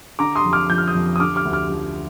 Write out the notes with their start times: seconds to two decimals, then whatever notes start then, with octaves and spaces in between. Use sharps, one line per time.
0.19 D3 A#5 D6
0.36 C6 D#6
0.44 F2
0.53 D6 F6
0.70 F3 G6
0.78 F6
0.87 D#6 G6
0.95 F2
1.16 D#6
1.20 D3 D6 F6
1.36 D6 F6
1.45 D2
1.53 D6 F6
1.70 F3